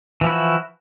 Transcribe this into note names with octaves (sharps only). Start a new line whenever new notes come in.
E3 F3 E4 F#4